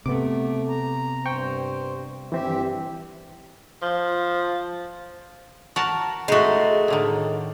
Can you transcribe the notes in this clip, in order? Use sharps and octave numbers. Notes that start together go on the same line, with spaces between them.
C3 A3 B3 D6
A#5
G2 C5 G5 C#6
G2 E3 C4 G4 E5
F3
F#4 A#4 A5
G#3 A3 D#4 F#4
A2 D3 D#3